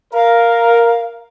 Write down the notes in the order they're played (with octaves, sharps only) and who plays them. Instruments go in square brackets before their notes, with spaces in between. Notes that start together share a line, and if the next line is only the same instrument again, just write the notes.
[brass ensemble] A#4 [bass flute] F5